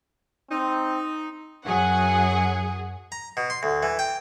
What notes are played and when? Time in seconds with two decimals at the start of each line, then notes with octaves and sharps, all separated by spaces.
0.51 C4 D#4
1.66 F#2 F#3 G#4 F#5 G#5
3.12 A#5
3.37 B2
3.50 C6
3.63 D2
3.83 E3
3.99 G5